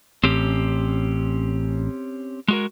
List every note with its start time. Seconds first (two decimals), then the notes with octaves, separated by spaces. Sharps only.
0.24 A1 C4 C#4 G4
2.48 G#3 F#4 A#4